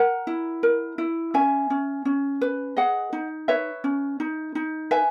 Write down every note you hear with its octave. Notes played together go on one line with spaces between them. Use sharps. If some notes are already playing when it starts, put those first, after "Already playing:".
Already playing: A#4 F#5 A#5
E4
A#4
E4
C#4 E5 G#5
C#4
C#4
B4
G#4 D#5 F#5
D#4
B4 C#5 E5
C#4
D#4
D#4
B4 E5 G#5